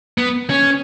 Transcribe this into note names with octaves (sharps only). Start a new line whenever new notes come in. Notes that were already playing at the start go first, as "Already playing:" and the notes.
B3
C#4